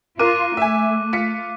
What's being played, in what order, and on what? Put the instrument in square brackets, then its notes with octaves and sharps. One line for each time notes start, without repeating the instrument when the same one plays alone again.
[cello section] F4 [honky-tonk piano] A#4 [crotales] D6 F#6 D#7
[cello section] A3 [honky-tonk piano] E5 G#5
[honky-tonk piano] F4 B6 C#7